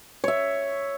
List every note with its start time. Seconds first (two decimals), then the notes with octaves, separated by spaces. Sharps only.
0.24 C#5 E5